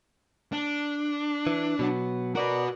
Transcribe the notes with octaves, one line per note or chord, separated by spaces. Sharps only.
D4
E3
B2 F#3 B3
F#4 A#4 B4 D5